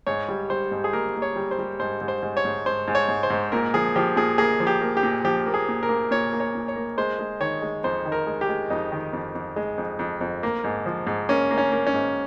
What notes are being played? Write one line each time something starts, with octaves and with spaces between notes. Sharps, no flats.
G#2 C#5
G3
G3 C5
G#2
G#4
A#3 A#4
A#3
C#5
G3
C5
G3
G#2 C5
G#2
C5
G#2
C#5
G#2
G#2 C5
G#2
C#5
G#2
C5
G#2
A#2 A#4
F3 G#4
F3 G4
A#2 G#4
A#3 G#4
F3
G4
A#3
G4
A#2
F3 G4
A#3
G#4
A#2
A#4
A#3
A#2 C#5
A#3
C#5
A#2
C#5
A#3
G#3 C5
G#3
D#3 C#5
G#3
F2 C5
D#3
A#4
G#3
G4
G#3
F2 D#4
D#3
F2
F2
G#3
F2
F2
F2
A#3
G#2
F3
G#2
A#3 C#4
A#3
C#4
A#3
C#4
G#2